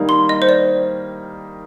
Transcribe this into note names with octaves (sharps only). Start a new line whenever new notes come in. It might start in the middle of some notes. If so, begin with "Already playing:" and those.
Already playing: D#3 G3 A#3 D#4
C6
D#5
C5
D5